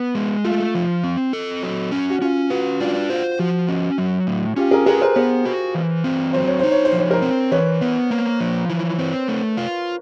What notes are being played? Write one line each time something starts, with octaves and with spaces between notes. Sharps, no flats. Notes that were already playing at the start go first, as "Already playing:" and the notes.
Already playing: B3
G#3
A3 F4
F3
C4
A4
F#3
C#4
F#4
C#4 F4
F#4 B4
D4 F4
F4 C5
F3 F#4
C#4
F#3
A2
C#4 F4 G4
G#4 A#4
G#4 A#4 B4
A#4 C5
B3 A#4 C5
F#4
E3
C4
F#3 C5
C#5
D#4 C5
C#5
C5
F3
C#5
A#4 C5
C4
E3 B4 C#5
B3
A#3
F3
E3
C4
A3
F4